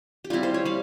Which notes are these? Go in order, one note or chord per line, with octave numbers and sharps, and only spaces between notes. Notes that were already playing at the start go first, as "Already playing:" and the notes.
G4
G3 C4 E4 F4
C5
C#5
G3 F5